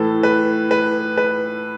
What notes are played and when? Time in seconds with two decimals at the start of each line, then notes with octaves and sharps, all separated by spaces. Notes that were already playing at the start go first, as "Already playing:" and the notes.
Already playing: A2 E3 A4
0.23 B4
0.71 B4
1.17 B4